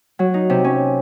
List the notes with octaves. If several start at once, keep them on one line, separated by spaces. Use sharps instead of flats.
F#3
D#4
C3
C#4